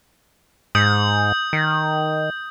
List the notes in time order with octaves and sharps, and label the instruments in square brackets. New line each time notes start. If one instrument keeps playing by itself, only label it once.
[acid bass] G#2 [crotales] D#6 G6
[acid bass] D#3